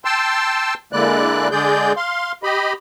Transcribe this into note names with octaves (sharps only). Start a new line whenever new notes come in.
G5 A5 C6 E6
D3 G#3 A#3 E4 D5 F#6
D3 G#3 G#4 D5 G6
F5 C6
G4 D#5 B5